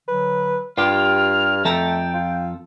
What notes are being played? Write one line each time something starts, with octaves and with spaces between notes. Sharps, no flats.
D3 F#3 B4
G2 F4 G4 F6
F2 A3 A4 G5 A#5
F4